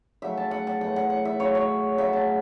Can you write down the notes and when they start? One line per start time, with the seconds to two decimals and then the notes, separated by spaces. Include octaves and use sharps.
0.22 C#3 F#3 A3 E5
0.38 A5
0.51 F#5
0.67 A5
0.81 A2 E3 A3 F#5
0.96 F#5
1.10 F#5
1.25 E5
1.39 C#3 F#3 A3 C#5
1.55 C#5
1.98 C#3 F#3 A3 E5
2.13 A5